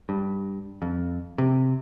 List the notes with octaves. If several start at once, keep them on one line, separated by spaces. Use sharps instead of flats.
G2
F2
C3